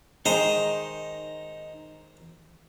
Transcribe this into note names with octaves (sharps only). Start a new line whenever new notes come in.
D#3 G#3 D#4 C5 D#5 A#5